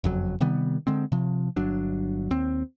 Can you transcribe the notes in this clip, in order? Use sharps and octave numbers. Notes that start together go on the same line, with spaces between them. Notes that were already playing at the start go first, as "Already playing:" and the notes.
F#1 F2 F#3
C3 D#3 G3 B3
D3 G#3 C4
C3 F3
G1 F#3 D4
D#2 C4